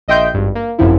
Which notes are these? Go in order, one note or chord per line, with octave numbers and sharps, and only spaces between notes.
A#1 D#5 E5 G5 C6 G6
G#1 G2
A#3
G#1 F#2 C3 F3 E4